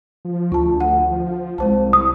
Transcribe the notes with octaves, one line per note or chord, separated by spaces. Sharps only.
F3
D2 F4 A5
F#5
F3
C2 G#3 C5 A5
D#6